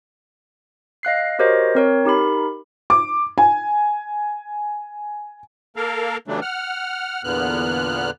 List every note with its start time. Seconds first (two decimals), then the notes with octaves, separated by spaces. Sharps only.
1.03 D#5 F5 F#6 C7
1.39 F#4 G4 A#4 C5 C#5 D#5
1.75 C4 A#4 C#5
2.05 D#4 G4 A#4 B5
2.90 D6
3.38 G#5
5.76 A#3 A4 A#4 F5
6.28 C#3 E3 F#3 G3 A3 D4
6.42 F#5 F6
7.24 E2 A#2 D3 B3 F6 F#6